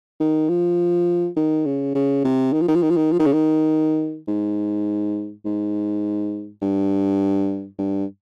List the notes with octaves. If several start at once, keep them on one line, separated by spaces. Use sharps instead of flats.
D#3
F3
D#3
C#3
C#3
C3
D#3
F3
D#3
F3
D#3
F3
D#3
F3
D#3
C#3
D#3
G#2
G#2
G2
G2